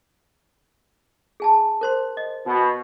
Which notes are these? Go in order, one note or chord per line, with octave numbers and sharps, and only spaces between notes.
G#4 G#5 A5
A#4 C5 C6
D#5
B2